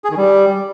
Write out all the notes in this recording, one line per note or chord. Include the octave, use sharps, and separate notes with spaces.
G#4
D#3
G3